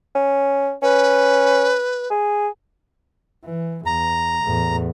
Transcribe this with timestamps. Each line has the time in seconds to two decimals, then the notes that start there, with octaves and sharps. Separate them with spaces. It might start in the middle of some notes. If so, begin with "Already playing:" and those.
0.15 C#4
0.82 C#4 B4
2.10 G#4
3.45 E3
3.86 E2 A#5
4.43 E2 A2